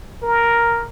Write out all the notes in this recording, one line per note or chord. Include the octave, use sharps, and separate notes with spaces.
A#4